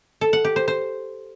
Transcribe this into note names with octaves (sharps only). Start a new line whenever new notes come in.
A4
F#5
G4
C5
C5